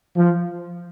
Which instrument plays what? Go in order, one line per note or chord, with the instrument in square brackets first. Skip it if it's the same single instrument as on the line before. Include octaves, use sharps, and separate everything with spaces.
[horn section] F3